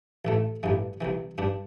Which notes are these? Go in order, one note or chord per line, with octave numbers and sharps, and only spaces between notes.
A1 A2 A3
A1 G2 E3
C2 C3 E3
G2 G3 D4